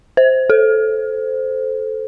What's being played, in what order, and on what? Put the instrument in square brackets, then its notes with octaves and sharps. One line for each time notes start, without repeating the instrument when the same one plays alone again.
[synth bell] C5
A4